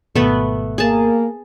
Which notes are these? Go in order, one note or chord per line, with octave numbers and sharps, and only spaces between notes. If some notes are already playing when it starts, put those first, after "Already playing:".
G#1 B2 A3 B3 B4
A#3 G#4 A5